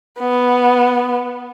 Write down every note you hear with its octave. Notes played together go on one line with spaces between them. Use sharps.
B3